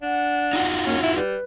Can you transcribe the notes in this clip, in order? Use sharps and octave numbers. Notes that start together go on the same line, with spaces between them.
D4 F#5
D#4 F4 F#4
A#3 C#4
E4 E5
G3 B4